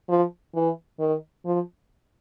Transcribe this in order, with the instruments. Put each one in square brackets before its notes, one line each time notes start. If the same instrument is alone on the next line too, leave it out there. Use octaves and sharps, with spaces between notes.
[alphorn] F3
E3
D#3
F3